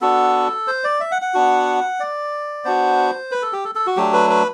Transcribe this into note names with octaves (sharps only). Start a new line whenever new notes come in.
B3 D4 F#4 A4
C5
D5
E5
F#5
F#5
B3 D4 F#4
D5
B3 D4 F#4 C5
B4
A4
G4
A4
A4
F#4
F#3 A3 D4 G4
B4
B4